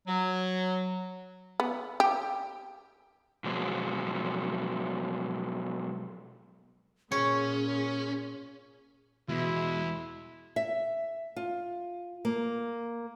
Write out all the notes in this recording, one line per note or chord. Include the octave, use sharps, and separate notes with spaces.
F#3
B3
G4
B2 F3 F#3 G#3
A#2 C#4 G#4 C#5
E2 B2 G#3 E4
E5
F4
A#3